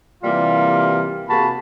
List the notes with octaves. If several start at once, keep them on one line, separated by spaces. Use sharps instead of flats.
C3 E3 G3 A#3 F4
C3 A#3 F#4 G#4 A5 B5